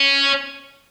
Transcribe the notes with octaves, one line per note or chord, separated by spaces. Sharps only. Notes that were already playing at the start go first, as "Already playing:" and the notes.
Already playing: C#4